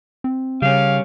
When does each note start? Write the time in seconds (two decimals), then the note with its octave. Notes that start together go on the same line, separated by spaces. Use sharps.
0.24 C4
0.62 C#3 G3 C#4 F5